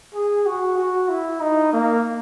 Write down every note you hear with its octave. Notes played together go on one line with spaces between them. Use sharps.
G#4
F#4
F#4
E4
D#4
A#3